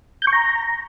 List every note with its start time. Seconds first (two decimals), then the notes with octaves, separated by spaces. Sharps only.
0.22 G6
0.27 C#6
0.33 A#5